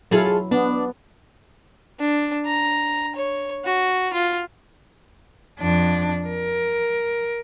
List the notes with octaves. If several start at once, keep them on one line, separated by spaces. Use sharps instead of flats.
F#3 E4 F4 G#4 A4
B3 D4
D4
A#5
C#5
F#4
F4
F2 D4
A#4